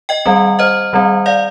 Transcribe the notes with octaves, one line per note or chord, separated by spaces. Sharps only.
D#5 G5
D#3 G3 C4
C5 D#5
D#3 G3 C4
D5 F5